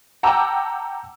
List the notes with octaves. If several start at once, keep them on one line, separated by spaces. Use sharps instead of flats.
F#5 G5 A5 A#5 D6 E6